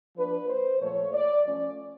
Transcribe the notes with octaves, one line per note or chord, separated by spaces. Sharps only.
F3 A#3 D4 B4
C5
A#2 F3 A3 C#5
D5
F3 A3 C#4 D5